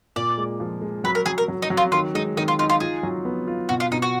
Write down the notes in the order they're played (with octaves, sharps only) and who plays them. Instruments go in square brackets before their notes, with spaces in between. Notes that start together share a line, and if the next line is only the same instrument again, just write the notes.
[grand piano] A#2 [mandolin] D5
[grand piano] G#3
F3
G#3
[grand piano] F#3 [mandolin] B4
[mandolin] A#4
[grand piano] F#3 [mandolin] G#4
[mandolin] A#4
[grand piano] F#3
[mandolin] D#4
[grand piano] F#3
[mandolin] F4
[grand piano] D#3 [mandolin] F4
[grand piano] G#3 [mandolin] D#4
[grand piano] D#3 [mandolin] D#4
[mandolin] F4
[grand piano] D#4 [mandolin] F4
[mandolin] F4
[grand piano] F4 [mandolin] G#4
[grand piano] F#3
B3
F4
[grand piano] B2 [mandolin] F#4
[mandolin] F4
[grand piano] B2 [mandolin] D#4
[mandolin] F#4